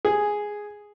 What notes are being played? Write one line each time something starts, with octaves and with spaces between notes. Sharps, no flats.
G#4